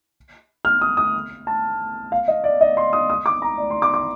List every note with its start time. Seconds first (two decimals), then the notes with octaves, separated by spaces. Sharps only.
0.65 F6
0.81 D#6
0.97 D#6
1.47 A5
2.12 F5
2.28 D#5
2.44 D5
2.61 D#5
2.77 C6
2.93 D#6
3.10 D#6
3.26 D6
3.42 A#5
3.58 D5
3.70 C6
3.82 D6
3.94 D6